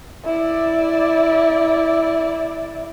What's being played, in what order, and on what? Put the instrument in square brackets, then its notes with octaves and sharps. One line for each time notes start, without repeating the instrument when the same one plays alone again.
[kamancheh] E4 D5